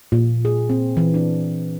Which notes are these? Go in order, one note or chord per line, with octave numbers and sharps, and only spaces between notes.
A#2
G#4
C4
E3
D4